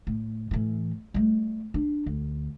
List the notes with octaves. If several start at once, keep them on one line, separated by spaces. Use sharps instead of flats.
A2
A2 E3
G3 A3
D4
D2